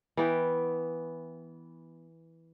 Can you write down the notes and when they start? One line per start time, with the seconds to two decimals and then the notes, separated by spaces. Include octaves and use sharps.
0.17 E3 B3 G5